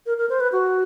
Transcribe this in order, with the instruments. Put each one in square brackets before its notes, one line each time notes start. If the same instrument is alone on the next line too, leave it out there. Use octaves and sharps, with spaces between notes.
[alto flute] A#4
A#4
C5
B4
F#4